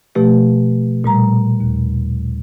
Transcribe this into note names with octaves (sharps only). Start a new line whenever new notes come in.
B2 F3 A3 G4
A#2 G3 A#5
D#2